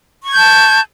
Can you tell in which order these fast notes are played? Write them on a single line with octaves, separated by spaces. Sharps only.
C#6 G#6 G6 A5